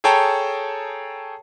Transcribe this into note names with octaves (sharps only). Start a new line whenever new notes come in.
G#4 A4 C#5 G5 A5 A#5